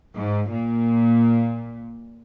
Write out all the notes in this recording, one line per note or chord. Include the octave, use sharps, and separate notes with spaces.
G#2
A#2